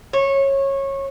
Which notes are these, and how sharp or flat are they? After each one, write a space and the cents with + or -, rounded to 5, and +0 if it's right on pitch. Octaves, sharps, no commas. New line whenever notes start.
C#5 -20